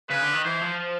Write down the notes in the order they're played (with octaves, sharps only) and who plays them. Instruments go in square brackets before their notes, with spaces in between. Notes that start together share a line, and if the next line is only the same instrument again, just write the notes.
[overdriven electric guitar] C#3 [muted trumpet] B4
[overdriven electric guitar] D3
D#3
[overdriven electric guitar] E3 [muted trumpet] C5
[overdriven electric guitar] F3